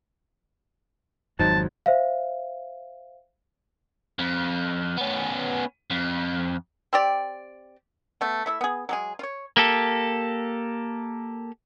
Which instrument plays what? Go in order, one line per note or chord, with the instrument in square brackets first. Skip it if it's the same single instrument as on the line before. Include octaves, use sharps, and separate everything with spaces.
[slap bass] G#1 F2 [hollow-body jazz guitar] F#3 D#4 C5 [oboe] A5
[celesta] C5 E5 F5
[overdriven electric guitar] F2
B3 C#4
F2
[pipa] C4 G4 D5
A3 B3
A3 E4 E5
B3 G#4
F#3 G#3 G#4
F4 C#5
[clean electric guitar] A#3 G4 A4